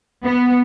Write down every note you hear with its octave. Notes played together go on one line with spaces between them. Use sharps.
B3